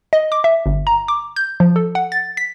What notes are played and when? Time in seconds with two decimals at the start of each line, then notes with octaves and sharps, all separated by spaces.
0.13 D#5
0.32 D6
0.44 E5
0.66 G1
0.87 A#5
1.08 D6
1.36 G6
1.60 F3
1.76 A4
1.95 F#5
2.12 A6
2.37 B6